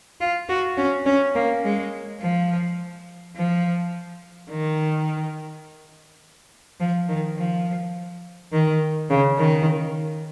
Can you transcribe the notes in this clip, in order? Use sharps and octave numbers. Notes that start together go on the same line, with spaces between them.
F4
F#4
C#4
C#4
A#3
G#3
F3
F3
D#3
F3
D#3
F3
D#3
C#3
D#3